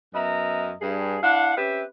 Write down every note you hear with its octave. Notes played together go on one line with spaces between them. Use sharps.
F#2 B3 D#5 E5 A#5
G2 G#4
D4 E4 F5 F#5
C4 C#4 G4 B4 E5